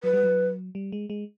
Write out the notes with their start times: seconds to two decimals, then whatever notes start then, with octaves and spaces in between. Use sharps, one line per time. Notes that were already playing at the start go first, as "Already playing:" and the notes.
0.04 F#3 B4
0.13 G3
0.23 F#3
0.75 G3
0.92 G#3
1.10 G#3